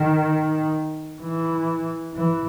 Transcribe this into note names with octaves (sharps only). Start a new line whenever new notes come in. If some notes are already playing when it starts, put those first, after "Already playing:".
Already playing: D#3
E3
E3